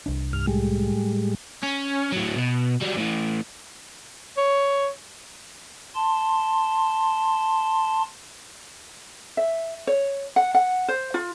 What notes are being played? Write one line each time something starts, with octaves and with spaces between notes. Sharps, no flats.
C2 D4
G2 F6
A2 G3 G#3
C#4
A2 F#3
B2
F#3 G3
A2 E3
C#5
A5 C6
E5
C#5
F#5
F#5
C5
F4